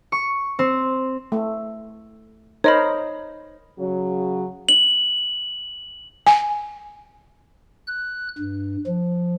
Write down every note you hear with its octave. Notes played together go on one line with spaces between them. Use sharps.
C#6
C4
A3
D#4 A#4 C5 C#5 D#5 B5
C#3 F#3
F#7
G#5
F#6
G2
F3